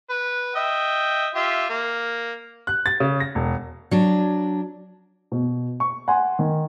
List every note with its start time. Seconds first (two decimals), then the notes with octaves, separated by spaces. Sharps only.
0.10 B4
0.56 D#5 E5 G5
1.35 F4 G4 E5
1.70 A#3
2.67 F#6
2.86 A6
3.00 C#3
3.20 A#6
3.35 E1
3.91 F#3 D4
5.32 B2
5.80 C#6
6.08 F#5 G#5 C6
6.39 D#3